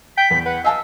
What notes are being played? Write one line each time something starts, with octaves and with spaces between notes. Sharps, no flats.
G5 B6
E2 B3
B4 F#5
D#5 F5 G#5 A5 E6